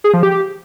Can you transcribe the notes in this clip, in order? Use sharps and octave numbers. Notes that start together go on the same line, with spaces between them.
G#4
F3
G4